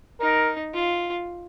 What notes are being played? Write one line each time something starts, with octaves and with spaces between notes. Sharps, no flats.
D#4 A#4
F4